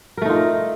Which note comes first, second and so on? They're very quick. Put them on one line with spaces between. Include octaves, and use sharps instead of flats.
A#4 A3 D#4 F4